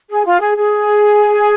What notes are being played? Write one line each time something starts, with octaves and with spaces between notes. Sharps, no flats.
G#4
F4
G#4
G#4